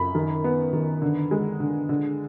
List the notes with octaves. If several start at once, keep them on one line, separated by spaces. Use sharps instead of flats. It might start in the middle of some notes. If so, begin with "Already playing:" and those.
Already playing: F#2 B5
D#3
B3
D#3
D3
G#3
D3
D3